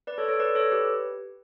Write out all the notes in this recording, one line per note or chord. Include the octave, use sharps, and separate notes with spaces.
B4 D5
A4 C#5
A4 C#5
B4 D5
A4 C#5
G4 B4